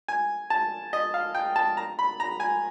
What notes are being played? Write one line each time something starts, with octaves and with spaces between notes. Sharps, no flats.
G#5
A5
D#5
F5
G5
A5
A#5
B5
A#5
G#5